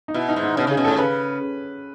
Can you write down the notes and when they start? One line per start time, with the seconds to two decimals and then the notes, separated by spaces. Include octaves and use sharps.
0.08 D#4
0.14 B2 E4
0.29 D#4
0.36 G#2
0.43 D#4
0.57 B2 C#4
0.67 C#3 G#4
0.77 B2
0.85 A2 A4
0.98 C#3 B4